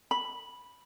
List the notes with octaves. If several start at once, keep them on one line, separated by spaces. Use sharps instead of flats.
B5